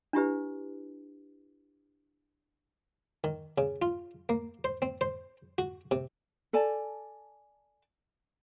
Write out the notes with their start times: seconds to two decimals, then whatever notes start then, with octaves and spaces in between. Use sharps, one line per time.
0.13 D4 E4 G4 B4
3.24 D#3
3.58 C#3
3.82 F4
4.29 A#3
4.64 C5
4.82 C4
5.01 C5
5.58 F#4
5.91 C3
6.53 A4 D5 G#5 A5